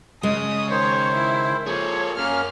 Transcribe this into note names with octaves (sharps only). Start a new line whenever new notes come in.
C#3 G#3 D#6
D#3 C5 C#5
E4
F3 A#3 G#4 A4 C#5
F#2 A#3 C#4 F6